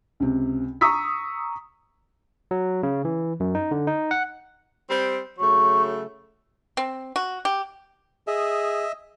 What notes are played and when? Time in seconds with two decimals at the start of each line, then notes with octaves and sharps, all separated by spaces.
0.20 C#2 C3
0.81 A#5 C#6 D#6 E6 B6
2.51 F#3
2.83 C#3
3.05 E3
3.40 F#2
3.55 D#4
3.71 D3
3.87 D#4
4.11 F#5
4.90 G3 C4
5.39 C#3 F#3 A3 C#6
6.77 C4
7.16 F#4
7.45 G4
8.27 G#4 D#5 E5